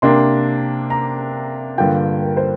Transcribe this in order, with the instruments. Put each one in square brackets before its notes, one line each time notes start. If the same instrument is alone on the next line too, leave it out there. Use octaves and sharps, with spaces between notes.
[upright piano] C3 A#3 D4 C6
A#5
G2 D3 A#3 F4 G5
A#4
C5